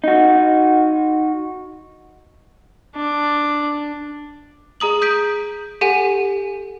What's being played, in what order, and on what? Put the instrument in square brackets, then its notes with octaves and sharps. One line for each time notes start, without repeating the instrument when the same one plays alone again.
[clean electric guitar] D#4 F#4
[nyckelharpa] D4
[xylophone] G#4 A#5 D#6 F#7
D#6 G6 B6 D7
G4 A4 F#5 G#5 D#7